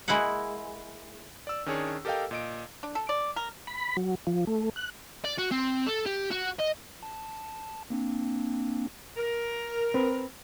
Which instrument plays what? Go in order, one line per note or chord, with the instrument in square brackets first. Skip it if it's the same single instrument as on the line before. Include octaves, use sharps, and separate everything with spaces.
[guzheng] G#3 A#3 E4 B4 F#5
[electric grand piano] D5 E6
D#3 C#4 D4 G#4 C#5
G4 A4 A#4 D#5 F5 G5
A#2 D#5 D7
[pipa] D4
A4
D5
A#4
[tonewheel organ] B5
F#3
F3
A3
F#6
[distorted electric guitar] D5
F#4
C4
A4
G4
F#4
D#5
[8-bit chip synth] A5
A#3 C4 D4
[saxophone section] A#4
[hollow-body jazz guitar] C4 B4